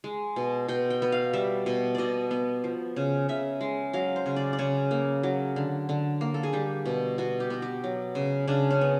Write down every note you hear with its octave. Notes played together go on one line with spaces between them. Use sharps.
G#3
B2
B2 G5
G5
B3
F5
G3 E5
B2
B2 D5 D#5
B3
F3
C#3
C#3 E5
G#3
F#3 F5
C5
C#3
D5
D5
C#3 C#5
A#3
F#3
D3
D3
A#3
A4
G#4
G3 G4
B2
B2 F#4
G4
B3 F#4
G4
F#3
C#3
C#3 D4
C#4
B3